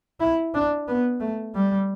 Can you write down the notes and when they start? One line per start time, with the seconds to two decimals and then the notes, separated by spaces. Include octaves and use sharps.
0.20 E4
0.54 D4
0.88 B3
1.20 A3
1.55 G3